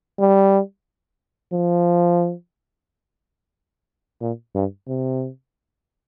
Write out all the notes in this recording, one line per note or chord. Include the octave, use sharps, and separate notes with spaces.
G3
F3
A#2
G2
C3